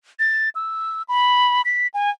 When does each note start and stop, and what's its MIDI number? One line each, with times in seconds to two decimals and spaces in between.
0.19 0.49 93
0.55 1.02 88
1.08 1.62 83
1.65 1.87 95
1.94 2.10 80